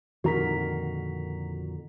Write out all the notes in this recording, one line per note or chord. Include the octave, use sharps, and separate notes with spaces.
F2 A#2 D3 D#3 F#4 A#4 A#5 B6